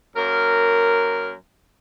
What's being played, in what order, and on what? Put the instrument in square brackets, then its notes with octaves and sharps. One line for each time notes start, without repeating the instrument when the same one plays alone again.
[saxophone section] F#2 A#3 A#4